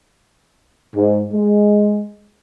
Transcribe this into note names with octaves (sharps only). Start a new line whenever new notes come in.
G#2
G#3